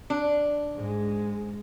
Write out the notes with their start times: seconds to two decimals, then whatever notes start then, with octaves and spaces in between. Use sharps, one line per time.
0.10 D4
0.74 G#2 G#3